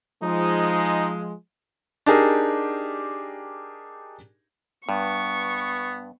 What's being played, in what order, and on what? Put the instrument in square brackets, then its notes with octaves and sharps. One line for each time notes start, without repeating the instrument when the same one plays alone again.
[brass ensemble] F3 G#3 [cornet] D#4
[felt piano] D4 D#4 G4 G#4 A#4
[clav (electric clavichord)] G2 [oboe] B3 [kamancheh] C#6